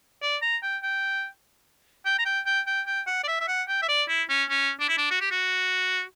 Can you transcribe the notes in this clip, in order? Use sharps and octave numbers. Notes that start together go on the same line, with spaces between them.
D5
A#5
G5
G5
G5
A#5
G5
G5
G5
G5
F#5
D5
E5
E5
F#5
G5
E5
D5
E4
C#4
C#4
D4
E4
D4
F#4
G4
F#4